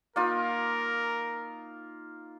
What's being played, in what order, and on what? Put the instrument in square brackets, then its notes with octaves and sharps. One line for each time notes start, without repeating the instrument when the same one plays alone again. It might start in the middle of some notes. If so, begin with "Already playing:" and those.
[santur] A#3 D#4 F4 [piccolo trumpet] A#4